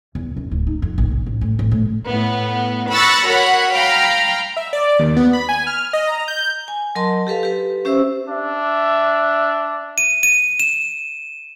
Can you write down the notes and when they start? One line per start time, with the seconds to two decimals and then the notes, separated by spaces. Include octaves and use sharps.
0.15 E2
0.36 F#2
0.51 D1
0.67 D#4
0.82 F2
0.98 A#1
1.11 B1
1.26 A1
1.41 A2
1.59 A1
1.71 A2
2.08 A2 B3
2.91 B5 C#6 E6 F#6 A6 A#6
3.27 F#4 A#4 C#5 F#5 B5
3.73 F5 G5 A#5 B5
4.57 E5
4.73 D5
4.99 D#2
5.16 B3
5.33 B5
5.49 G#5
5.67 F6
5.93 D#5
6.07 A#5
6.28 G6
6.68 G#5
6.95 F#3 A#4 D#5 A5 C6
7.27 G4 A4 B4 F5
7.43 G4 B4
7.85 C#4 G4 C5 E5 E6
8.29 D4 E5
9.98 D#7
10.23 D#7
10.60 E7